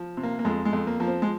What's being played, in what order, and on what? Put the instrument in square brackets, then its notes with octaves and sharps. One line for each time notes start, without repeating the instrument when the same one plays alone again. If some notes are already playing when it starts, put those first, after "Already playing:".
Already playing: [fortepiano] F3
C3
A#3
A#3
F2 G#3
G#3
F2
A#3
F3 A#3
C4
G#3